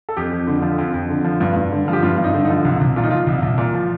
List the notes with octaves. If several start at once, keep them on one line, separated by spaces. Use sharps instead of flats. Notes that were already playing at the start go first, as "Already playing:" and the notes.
A4
F2 G4
F2
D3
F3
F2
F2
D3
F3
G2
G2
D3
F3
G4
G2 F4
G2
D#4
D3
D#4
F3
C2
C2
A#2 F4
D#4
F3 F4
C2
C2
A#2
F3